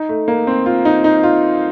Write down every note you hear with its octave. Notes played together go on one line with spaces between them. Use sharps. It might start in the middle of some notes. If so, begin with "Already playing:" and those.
Already playing: D#4
A3
A#3
C4
F4
D#4
D#4
F4